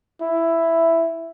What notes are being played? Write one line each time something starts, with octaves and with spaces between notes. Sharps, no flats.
E4